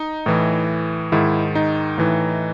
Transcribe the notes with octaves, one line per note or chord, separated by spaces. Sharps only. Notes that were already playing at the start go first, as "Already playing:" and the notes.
Already playing: D#4
A2 E3
G#2 D#3 E4
D#4
A2 E3